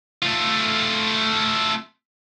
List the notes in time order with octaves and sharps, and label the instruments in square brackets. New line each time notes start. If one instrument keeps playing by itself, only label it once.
[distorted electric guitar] A3 F4